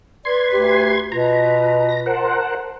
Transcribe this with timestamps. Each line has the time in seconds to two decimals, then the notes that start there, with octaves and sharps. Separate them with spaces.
0.25 B4 D5 C6 G#6
0.52 D2 G4
1.12 B2 F4 B4 A#5
1.89 A#6
2.06 A#4 C5 F#5 A5